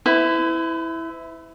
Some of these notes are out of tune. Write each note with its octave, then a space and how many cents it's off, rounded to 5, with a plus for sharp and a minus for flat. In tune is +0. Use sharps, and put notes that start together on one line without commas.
E4 -5 B4 +45